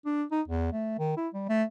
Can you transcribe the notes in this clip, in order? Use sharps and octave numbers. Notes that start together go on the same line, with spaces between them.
D4
D#4
E2
A3
D#3
E4
G3
A3